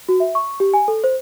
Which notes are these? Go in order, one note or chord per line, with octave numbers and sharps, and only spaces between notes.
F#4
E5
C#6
G4
G#5
A4
C5